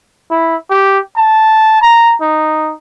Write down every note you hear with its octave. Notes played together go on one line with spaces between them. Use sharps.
E4
G4
A5
A#5
D#4